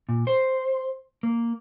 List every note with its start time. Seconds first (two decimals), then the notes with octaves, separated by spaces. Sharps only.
0.09 A#2
0.27 C5
1.23 A#3